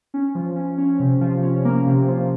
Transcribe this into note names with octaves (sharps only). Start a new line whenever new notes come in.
C#4
F3
C#4
C#4
C3
F3
C#4
A#3
C3
F3